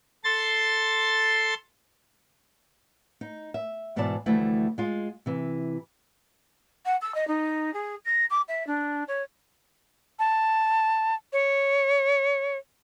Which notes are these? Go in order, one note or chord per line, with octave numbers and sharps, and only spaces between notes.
A4 C6 A6
D#4
E5
G#2 B2 E3 E4 D5 A5
D2 E3 F3 G3 A3 E4
G#3 F4
C3 E3
F#5
E6
D#5
D#4
G#4
A#6
D6
E5
D4
C#5
A5
C#5